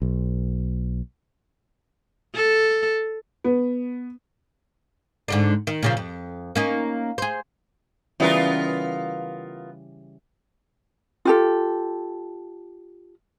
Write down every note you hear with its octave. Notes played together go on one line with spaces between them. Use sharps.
B1
A4
B3
G#2 D3 D4
D#3
A#2 C#3 F3
F2
A#3 C#4 D#4
G#4 C5
C#3 E3 G3 B3 F4 A#4
F4 G4 A4